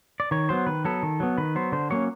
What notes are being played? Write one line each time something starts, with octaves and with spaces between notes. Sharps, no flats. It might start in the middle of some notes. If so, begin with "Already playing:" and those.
D5
D#3 C#5
F#3 B3 C5
D#3 B4
F#3 B3 A4
D#3
F#3 B3
D#3 B4
F#3 B3 C5
D3 C5
F#3 A#3 C#4 C#5